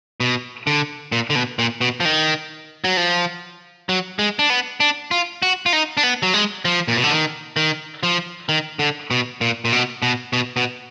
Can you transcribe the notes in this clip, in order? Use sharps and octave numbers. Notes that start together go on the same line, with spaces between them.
B2
D3
A#2
D3
B2
A#2
B2
F3
D#3
F#3
F3
F#3
G#3
D4
B3
D4
F4
F#4
F4
D#4
D4
B3
F#3
G#3
F3
A#2
B2
D3
D#3
D#3
F3
D#3
D3
B2
A#2
A#2
B2
B2
B2
B2